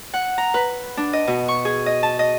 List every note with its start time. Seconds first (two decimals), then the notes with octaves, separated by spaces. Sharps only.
0.14 F#5
0.38 A#5
0.54 B4
0.97 D4
1.13 D#5
1.27 B2
1.48 C#6
1.65 G#4
1.86 D#5
2.03 A5
2.19 D#5